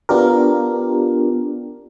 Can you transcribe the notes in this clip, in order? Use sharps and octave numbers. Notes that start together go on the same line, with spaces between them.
B3 D4 F4 G4 A#4